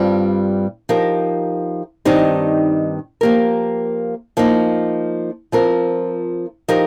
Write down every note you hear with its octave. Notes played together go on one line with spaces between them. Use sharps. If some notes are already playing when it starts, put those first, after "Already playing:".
Already playing: G2 G3 C4 F4
F3 D#4 G4 A#4
G2 D#3 C4 D#4 G4
F3 A#3 G4 A#4
F3 A#3 D#4
F3 C4 F4 A#4
F3 D#4 G4 A#4